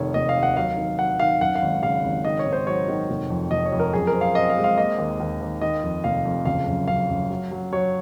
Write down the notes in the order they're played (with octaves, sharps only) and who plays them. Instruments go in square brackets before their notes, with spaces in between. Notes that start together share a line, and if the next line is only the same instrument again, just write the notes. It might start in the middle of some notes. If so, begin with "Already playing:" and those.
Already playing: [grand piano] F1 D#3 C#5
F1 D#5
F5
D#2
F#5
F#3 F5
D#3
F#3 F#5
D#3 F5
F#2 F#5
F5
G#1
C#3 F5
G#1
D#3 D#5
C#5
G#2
C5
F#3 C#5
D#3
F1
F2
F1 D#5
C#5
F2
A#4
F#2 G#4
A#4
C4
F5
C4 D#5
F5
G#3
F5
A#3 D#5
D#2
D#2
D#2
D#3 D#5
F2
F1 F5
F2
F#1 F5
F#2
F#2 F5
F#2
F#3
F#3
F#3 C#5